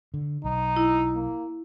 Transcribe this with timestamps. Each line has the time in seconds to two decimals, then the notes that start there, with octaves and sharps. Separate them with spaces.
0.14 D3
0.44 B1 D#4
0.76 E4
1.15 A#3